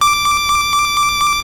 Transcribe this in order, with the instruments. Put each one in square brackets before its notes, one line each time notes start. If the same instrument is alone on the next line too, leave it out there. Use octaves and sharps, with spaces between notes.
[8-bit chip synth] D6